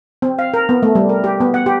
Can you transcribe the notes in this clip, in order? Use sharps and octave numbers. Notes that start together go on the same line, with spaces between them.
C4
F5
A#4
B3
A3
G3
A#4
G4
B3
F#5
G4